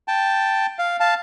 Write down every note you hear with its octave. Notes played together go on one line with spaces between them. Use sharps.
G5 A5
F5
F5 A5